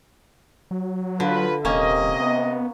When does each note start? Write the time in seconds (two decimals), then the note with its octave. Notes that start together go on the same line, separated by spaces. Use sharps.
0.71 F#3
1.20 D3 F4 B4
1.65 D#1 C3 A#3 C#4 D#5
2.20 B3